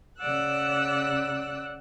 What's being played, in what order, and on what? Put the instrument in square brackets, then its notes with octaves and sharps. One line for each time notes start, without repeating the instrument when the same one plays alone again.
[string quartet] C#3 D5 F#5 E6 F#6